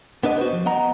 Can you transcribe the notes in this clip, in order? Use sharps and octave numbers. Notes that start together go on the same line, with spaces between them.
B3 D4 B4 D#5
F#4 C5
F3
B3 D#5 F#5 A#5